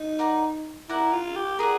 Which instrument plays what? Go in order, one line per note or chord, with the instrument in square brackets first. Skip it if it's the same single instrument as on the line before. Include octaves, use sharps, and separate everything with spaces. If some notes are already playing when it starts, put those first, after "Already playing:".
Already playing: [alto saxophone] D#4
[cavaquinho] A#4 D5 F#5 A#5
[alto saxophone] E4 [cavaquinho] A#4 D5 F#5 A#5
[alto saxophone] F4
G4
[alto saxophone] G#4 [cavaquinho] A#4 D5 F#5